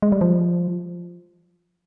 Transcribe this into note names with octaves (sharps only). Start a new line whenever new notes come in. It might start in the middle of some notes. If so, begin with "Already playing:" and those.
G#3
G3
F3